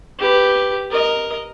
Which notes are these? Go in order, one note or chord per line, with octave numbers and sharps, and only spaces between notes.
G4 B4
A#4 D#5